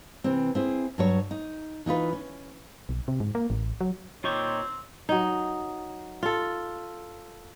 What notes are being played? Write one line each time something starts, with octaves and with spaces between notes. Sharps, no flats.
C3 E3 C4
C4 E4 G#4
G2 F#3 C#5
D#4
E3 D#4 F4 B4
C#4
B1
C3
G#2
A#3
A1
F#3
A#2 C4 D#4 F4 C#5 G5 C#6 D6
F#3 D#4
F4 A4